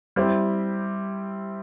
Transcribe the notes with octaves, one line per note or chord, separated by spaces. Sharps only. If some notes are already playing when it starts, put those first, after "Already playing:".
G3 C4 E4 G4